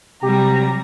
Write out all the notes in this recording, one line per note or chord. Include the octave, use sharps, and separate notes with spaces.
C3 F#3 G3 G4 A#5